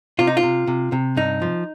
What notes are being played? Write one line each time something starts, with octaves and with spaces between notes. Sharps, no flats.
C3 F4
D#4
F4
C3
C3
C3
G2 D#4
F3